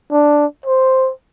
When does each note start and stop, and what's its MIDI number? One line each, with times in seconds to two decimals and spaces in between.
0.11 0.46 62
0.66 1.11 72